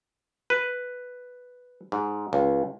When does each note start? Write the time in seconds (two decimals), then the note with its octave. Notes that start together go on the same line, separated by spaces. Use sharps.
0.50 B4
1.92 G#2
2.33 C#2